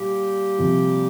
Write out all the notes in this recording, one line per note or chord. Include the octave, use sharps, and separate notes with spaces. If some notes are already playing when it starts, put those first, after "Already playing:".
Already playing: A#2 G3 A#3 G4
C3 F3